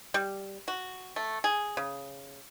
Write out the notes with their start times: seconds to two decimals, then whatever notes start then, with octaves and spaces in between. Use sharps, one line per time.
0.14 G3
0.68 F#4
1.16 A3
1.44 G#4
1.77 C#3